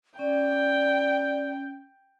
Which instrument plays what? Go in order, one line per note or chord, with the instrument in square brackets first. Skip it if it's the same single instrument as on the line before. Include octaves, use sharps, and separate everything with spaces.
[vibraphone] C#4 [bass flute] D5 [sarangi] G5